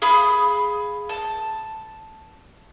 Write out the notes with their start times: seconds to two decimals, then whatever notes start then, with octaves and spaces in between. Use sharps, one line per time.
0.02 G#4 F5 B5 D#6
1.09 A5